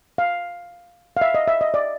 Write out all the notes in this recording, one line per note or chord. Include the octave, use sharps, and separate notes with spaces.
F5
F5
E5
D#5
E5
D#5
D5